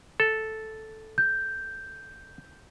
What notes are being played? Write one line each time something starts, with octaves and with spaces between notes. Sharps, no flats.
A4
G6